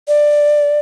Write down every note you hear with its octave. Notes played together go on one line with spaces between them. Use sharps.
D5